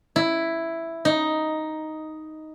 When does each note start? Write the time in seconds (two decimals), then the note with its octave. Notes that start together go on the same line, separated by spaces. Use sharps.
0.16 E4
1.05 D#4